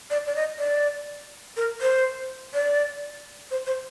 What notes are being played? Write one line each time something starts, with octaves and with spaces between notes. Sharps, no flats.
D5
D5
D#5
D5
A#4
C5
D5
C5
C5